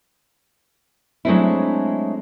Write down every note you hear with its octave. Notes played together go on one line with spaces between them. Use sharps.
F#3 G#3 A3 C4 D4 E4